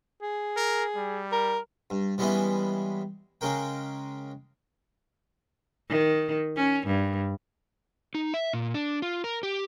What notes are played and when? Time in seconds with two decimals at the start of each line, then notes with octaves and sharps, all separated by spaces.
0.22 G#4
0.56 A#4
0.96 G3
1.32 A#4
1.90 G2
2.18 E3 G3 G#3 B3 C#4 E4
3.41 C#3 G#3 C#4 A#4 G5
5.89 D#3
6.56 C#4
6.86 G2
8.15 D#4
8.34 E5
8.53 A#2
8.74 D4
9.02 F4
9.24 A#4
9.43 G4